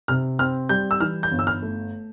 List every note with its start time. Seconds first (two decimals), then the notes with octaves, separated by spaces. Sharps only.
0.08 C3 F6
0.39 C4 F6
0.69 G3 G6
0.91 E6
1.01 E3 F6
1.23 G6
1.31 G1
1.39 E6
1.47 F6
1.62 A3